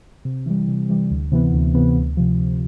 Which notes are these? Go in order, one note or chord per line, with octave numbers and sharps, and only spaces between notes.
C3
E3 G3
C3
E3 G3
D2
C3 E3 B3
D2
C3 E3 B3
D2
C3 F3
D2